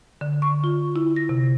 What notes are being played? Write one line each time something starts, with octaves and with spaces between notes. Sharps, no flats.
D3
C#6
F4
E4
A#6
C3